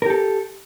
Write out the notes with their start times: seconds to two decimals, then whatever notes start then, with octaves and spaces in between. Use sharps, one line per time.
0.02 A#4
0.06 G4
0.10 A4